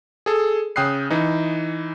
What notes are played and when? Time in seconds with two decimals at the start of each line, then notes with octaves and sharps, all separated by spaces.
0.26 G#4 A4
0.76 C#3 G5 D#6 F#6 C7
1.10 E3 D#4